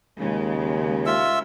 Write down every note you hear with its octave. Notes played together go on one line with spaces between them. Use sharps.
D#2 C#3 G#3
F4 E5 E6